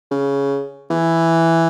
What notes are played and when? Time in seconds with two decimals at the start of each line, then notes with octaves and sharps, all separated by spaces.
0.11 C#3
0.90 E3